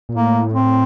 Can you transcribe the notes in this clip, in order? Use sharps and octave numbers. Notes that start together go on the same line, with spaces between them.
A#2
A2 A#3
C4